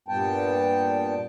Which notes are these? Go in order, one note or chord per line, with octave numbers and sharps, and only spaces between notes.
G2 A#2 G3 B3 G5 A5